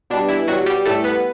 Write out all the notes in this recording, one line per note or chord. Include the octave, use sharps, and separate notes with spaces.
B2 G3 D4
E3 E4
B2 F#3 G3 F#4
G3 G4
A2 E3 G3 A3 A4
B3 B4